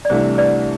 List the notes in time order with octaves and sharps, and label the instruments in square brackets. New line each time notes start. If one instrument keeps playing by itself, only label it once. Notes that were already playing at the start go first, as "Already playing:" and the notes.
[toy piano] D5
[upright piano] C2 C3 E3 A3 D4 [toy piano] C5
[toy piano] B4 D5